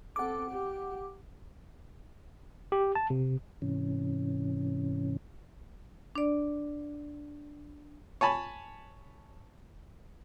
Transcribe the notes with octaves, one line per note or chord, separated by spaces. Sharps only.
C4 A4 F#5 D6
G4
G4
A5
C3
G#2 C3 E3 C#4
D4 D5
C#5 G#5 A5 B5